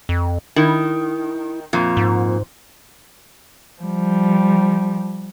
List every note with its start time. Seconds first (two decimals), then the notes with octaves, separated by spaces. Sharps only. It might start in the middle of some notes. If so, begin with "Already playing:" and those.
0.09 F2
0.56 D#3 E4
1.73 F2 A#2
1.97 G#2
3.82 F3 G3